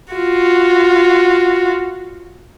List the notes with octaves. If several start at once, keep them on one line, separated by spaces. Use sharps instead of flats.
F4 F#4